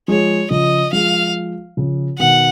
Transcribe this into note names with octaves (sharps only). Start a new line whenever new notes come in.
F3 G#3 C#5
C#3 F3 D#5
F3 G#3 F5
C#3 F3
B2 D#3 F#5